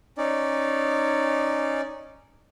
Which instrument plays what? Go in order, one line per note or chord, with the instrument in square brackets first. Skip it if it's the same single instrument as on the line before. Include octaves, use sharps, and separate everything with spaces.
[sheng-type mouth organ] C#4 D#4 D5